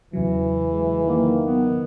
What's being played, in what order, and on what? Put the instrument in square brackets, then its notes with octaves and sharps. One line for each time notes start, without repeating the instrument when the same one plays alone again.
[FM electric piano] E2 C#3 F#3 [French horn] E3
[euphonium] G#3
[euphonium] D#3 [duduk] A#3
[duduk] B3